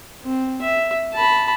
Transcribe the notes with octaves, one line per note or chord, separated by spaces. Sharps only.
C4
E5
A5 B5